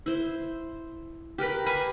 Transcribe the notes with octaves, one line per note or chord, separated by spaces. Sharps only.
E4 C5
G4 A#4 B4 B5
F5 G#5 B5